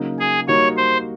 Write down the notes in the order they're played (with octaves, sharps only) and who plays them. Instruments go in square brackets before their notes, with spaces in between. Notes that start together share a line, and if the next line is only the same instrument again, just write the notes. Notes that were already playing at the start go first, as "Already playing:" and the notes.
Already playing: [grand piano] C#3 F#3 A#3 D#4
[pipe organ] G#4
[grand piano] G3 A#3 D#4 F#4 [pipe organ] C#5
[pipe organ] C5